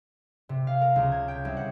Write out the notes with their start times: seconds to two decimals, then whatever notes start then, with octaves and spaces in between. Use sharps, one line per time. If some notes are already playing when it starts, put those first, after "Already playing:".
0.49 C3
0.67 F5
0.81 A#4
0.96 C#2
1.12 G#6
1.28 G5
1.45 C2
1.57 F#5